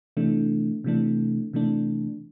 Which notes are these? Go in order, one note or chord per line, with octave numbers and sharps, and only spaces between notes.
C3 E3 A3 D4
C3 E3 A3 D4
C3 E3 A3 D4